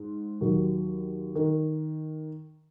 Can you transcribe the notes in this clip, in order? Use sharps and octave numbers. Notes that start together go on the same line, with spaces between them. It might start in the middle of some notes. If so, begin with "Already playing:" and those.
Already playing: G#2
D#2 D#3 F#3
D#3